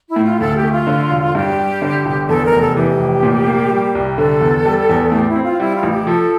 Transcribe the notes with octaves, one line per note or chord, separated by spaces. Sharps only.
E4
A2
F4
D2 A4
G4
A3
F4
D3
E1
G2 G4
G3
D3
G1
E2 A4
A#4
F1
A4
E3 G4
F1
A#2
A#3
G3
C2
D3 A4
E2
G3
E2
A2 G4
E4
C4
F4
G3 E4
F4
A1
G4
F3 A4